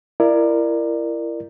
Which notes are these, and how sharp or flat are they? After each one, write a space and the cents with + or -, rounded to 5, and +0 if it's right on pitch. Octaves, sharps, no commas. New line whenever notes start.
E4 +30 A#4 +0 D5 +20